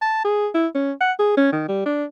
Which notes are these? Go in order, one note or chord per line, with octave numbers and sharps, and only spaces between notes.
A5
G#4
E4
C#4
F#5
G#4
C#4
D#3
G3
D4